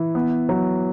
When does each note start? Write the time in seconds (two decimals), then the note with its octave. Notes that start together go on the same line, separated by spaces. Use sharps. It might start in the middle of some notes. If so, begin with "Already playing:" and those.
Already playing: E3
0.15 B3
0.49 F#3